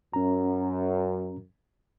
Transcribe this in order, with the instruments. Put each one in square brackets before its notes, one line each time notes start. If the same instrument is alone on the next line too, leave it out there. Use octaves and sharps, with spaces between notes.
[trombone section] F#2 [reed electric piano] C#4 A#5